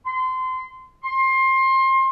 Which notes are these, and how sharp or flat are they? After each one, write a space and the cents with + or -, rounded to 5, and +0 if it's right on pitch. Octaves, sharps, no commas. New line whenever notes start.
C6 -25
C6 +25